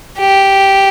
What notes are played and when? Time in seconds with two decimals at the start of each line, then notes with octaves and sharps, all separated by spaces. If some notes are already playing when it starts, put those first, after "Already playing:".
0.18 G4